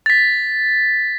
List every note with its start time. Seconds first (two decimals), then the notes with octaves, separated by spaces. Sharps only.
0.06 A6 B6